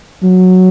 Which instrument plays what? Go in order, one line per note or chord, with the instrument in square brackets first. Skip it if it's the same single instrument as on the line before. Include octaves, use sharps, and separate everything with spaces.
[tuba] F#3